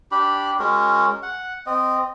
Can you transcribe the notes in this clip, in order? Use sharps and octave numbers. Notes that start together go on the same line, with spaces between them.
D4 G4 B5
G#3 C#4 F#4 A#4
F#5
C4 D#5